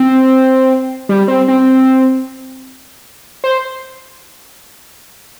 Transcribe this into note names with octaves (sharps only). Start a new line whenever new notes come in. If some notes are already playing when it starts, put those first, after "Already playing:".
Already playing: C4
G3
C4
C4
C5